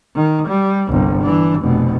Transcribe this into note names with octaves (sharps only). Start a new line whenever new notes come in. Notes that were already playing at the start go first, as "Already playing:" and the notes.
D#3
G3
G1 C2
E3 D4
F1 B2